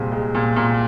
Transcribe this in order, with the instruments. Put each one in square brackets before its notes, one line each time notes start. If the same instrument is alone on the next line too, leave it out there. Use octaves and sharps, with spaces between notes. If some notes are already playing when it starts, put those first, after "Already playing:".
Already playing: [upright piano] C2 A#2 G#3 C4
G#3
A#2
A#2